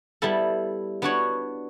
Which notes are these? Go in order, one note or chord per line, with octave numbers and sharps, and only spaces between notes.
G3 B3 E4 A4
B3 D4 F#4 C#5